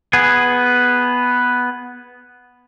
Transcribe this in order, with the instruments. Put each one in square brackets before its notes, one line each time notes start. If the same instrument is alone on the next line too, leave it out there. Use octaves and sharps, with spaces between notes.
[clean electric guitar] B3 G#4